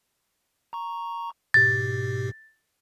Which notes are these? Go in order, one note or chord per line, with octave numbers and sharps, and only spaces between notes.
A#5 C#6
G#2 B2 G4 A6